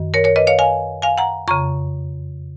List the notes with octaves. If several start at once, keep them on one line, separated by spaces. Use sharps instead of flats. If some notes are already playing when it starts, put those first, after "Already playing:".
Already playing: F#2 D#3
A#4 C#5
A#4 C#5
B4 D#5
C#5 F5
F5 G#5
F5 G#5
F#5 A#5
F2 C#3 A#5 C#6